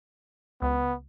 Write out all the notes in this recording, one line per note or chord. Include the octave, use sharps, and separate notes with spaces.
C#2 B3